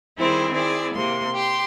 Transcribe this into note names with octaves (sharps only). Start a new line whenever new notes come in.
D#3 G3 C4 E4 G#4
C4 E4 G#4 D5
C3 A#3 C6
G4 C6